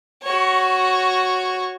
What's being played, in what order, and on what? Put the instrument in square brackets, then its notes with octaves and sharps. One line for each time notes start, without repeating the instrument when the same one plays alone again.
[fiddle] F#4 C#5